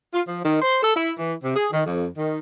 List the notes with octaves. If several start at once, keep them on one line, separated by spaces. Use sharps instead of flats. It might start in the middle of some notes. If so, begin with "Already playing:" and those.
F4
F3
D#3
C5
A4
E4
E3
C3
G#4
D#3
F2
D#3